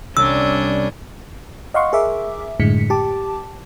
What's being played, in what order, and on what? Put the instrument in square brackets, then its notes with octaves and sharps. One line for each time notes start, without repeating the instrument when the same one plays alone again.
[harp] C2 [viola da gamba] C#4 D4 [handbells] E6
[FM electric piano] D#5 F5 F#5 C6 C#6
G#4 A#4 E5 D6
F#2 A2 D3 G#3 B6 C#7
G4 A5 D6